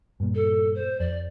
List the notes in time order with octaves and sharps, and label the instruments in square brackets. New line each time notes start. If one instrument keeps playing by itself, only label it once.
[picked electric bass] G2 A#2
[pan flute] A4
C5
[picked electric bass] F2 [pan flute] D5